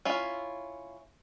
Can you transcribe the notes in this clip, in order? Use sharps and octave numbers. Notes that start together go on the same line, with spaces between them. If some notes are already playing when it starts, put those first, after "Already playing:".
C#4 E4 F4